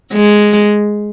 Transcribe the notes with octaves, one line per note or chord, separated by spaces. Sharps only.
G#3